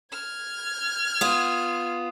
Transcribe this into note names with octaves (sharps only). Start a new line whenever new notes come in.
F6 G#6
B3 F4 D#6 E7